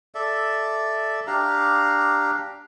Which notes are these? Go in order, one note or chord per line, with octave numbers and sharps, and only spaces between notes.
A4 D5 E5
D4 G4 F5 A#5